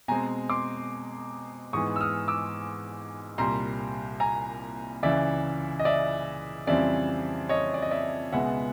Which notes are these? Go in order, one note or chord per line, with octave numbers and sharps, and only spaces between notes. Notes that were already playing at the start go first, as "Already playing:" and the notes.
B2 G#3 C4 G#5 A#5
C6 D6
G#2 E3 G#3 B3 C#6 D#6
E6
D#6 F6
D6 E6
C2 A#2 G3 A#5 C6
G#5 A#5
C#2 C#3 E3 D5 E5
D#5
D5 E5
F2 C#3 E3 G3 C4 D5 E5
C#5 D#5
D5
D#5
D5 E5
C#2 B2 G#3 B3 E5 F#5